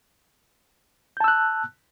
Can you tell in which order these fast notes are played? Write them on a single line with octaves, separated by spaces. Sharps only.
G6 A5 E6 F#6